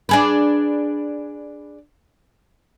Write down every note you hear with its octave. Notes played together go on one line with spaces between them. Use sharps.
D4 G#4 B4